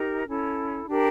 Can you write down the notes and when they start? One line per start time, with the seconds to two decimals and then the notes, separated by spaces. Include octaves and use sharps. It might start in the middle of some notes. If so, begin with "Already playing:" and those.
Already playing: D#4 G4 A#4
0.27 C#4 E4 A4
0.86 D4 G4 A#4